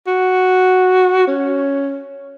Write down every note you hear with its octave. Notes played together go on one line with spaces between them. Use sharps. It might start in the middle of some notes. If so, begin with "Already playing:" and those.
F#4
C#4